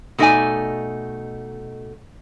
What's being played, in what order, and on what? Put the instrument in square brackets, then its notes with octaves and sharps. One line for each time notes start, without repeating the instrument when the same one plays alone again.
[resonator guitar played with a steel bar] B2 A3 D#4 E4 D5 G#5